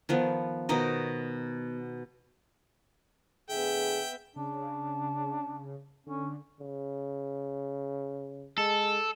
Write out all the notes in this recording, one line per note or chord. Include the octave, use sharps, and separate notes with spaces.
D#3 F3 B3
B2 D#3 D#4 D#5
A2 D3 B3 G#4 E5 G5
C#3 D4
D3 C#4
C#3
G#3 A4